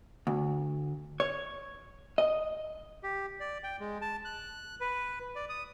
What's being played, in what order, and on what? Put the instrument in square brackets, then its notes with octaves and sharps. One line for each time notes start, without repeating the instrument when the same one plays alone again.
[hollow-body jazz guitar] D2
C#5
D#5
[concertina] G4
D5
G5
G#3
A5
F#6
B4
D5
D#6